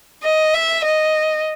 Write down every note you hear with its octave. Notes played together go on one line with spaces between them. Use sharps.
D#5
E5
D#5